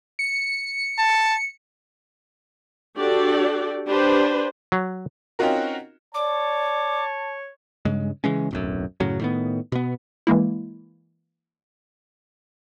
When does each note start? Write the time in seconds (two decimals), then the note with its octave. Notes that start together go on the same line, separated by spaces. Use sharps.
0.19 C#7
0.98 A5
2.98 D4 F#4 G4 A4 D5
3.89 D4 G4 B4 C5
4.72 F#3
5.39 C4 C#4 D#4 F4 F#4 A#4
6.15 C#5 D5 A5 D6
7.85 G2 C#3 G#3
8.24 C#3 E3 G#3 C#4
8.51 D1 B1 F#2
9.00 F#2 A2 C#3 F#3
9.20 A2 D#3 B3
9.72 B2 B3
10.27 E3 G#3 A#3 E4